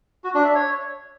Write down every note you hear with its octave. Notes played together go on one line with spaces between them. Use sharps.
F#4
D4
E5
C#5